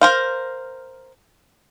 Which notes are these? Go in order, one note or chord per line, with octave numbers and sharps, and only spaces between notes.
A#4 C5 F5